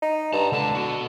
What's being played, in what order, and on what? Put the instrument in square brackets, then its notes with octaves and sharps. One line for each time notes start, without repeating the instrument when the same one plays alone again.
[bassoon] D#4
[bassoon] G2 [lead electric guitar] A5 A#5
[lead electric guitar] C#2 A5 [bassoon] D3
[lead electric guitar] B3 F#4